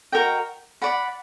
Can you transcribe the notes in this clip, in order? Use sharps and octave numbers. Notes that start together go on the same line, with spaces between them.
F#4 A#4 D#5 G5
D5 F#5 B5